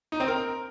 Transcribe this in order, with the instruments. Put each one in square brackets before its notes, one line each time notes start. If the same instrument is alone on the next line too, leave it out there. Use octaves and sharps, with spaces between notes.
[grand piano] D#4
C4
A#4